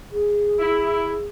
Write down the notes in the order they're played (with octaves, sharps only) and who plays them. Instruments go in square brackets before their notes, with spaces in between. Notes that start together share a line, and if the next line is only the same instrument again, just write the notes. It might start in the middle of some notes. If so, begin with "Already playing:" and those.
[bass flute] G#4
[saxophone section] E4